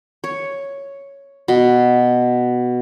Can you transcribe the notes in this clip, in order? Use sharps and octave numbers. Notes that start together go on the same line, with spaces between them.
C#5
B2